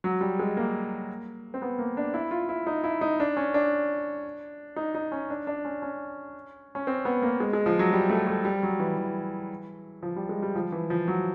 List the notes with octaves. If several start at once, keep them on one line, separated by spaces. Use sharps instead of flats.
F#3
G3
G#3
A#3
C4
B3
A#3
D4
E4
F4
E4
D#4
E4
D#4
D4
C#4
D4
D#4
D#4
C#4
D4
D4
C#4
C#4
C#4
C4
B3
A#3
G#3
G#3
F3
F#3
G3
A3
A3
G3
F#3
E3
E3
F3
G3
G#3
G3
F3
E3
F3
F#3